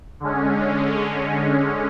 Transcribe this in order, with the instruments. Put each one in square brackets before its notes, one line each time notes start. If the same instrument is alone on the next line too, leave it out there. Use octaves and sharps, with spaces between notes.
[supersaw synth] D3 G#3 C#4